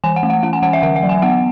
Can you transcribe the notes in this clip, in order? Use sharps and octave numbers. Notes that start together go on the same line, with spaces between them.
E3 G#5
F#5
A3
F#5
C#4 F#5
G#5
E3 F#5
E5
D3 F#5
E5
F#3
G#5
B3 F#5